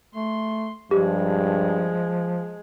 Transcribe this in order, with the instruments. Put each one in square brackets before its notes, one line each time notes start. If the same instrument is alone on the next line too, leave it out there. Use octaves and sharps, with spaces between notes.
[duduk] A3 [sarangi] C6
[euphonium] G2 [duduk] F3 [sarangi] G#3 [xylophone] G4